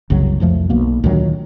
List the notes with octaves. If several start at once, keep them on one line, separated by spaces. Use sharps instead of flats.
F#1 C2 C#3 F#3
C2 F2 F3 A3
B1 B2 A#3 B3
D2 A#2 D#3 F#3